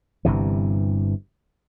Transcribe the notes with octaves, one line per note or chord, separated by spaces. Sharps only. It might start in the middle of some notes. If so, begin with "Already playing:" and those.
G1 G2 C3 E3